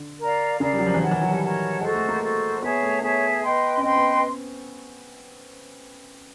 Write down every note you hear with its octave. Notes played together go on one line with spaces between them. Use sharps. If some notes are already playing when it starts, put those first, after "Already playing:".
Already playing: D3
A#4 D5 F5
C#3 A#4 D5 F5
G3
F#3
F3
E3
D#3 A#4 C#5 F#5 A5
E3
F#3
G3
A#4 C#5 F#5 A5
G#3 F#4 A4 C5
A3
A#3
F#4 A4 C5
B3 G#4 C#5 E5 A5
A3
B3 G#4 C#5 E5 A5
B4 D#5 G5 C6
C#4
C4 B4 D#5 G5 C6
B3